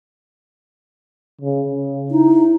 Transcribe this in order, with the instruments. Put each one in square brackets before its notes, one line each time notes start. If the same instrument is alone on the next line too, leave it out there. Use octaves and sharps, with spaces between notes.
[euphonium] C#3
C#3
[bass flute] D#4 [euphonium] E4